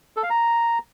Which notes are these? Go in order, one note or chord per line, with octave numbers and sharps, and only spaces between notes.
A4
F5
A#5